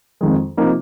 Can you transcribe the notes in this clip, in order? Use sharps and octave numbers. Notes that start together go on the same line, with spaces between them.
F2 D#3 G#3
C3 F3 A#3 D#4